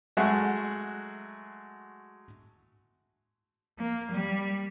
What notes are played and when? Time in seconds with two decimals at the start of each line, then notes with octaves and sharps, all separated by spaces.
0.17 F#3 G#3 A3 F#4 G#4
3.79 A#3
4.12 G3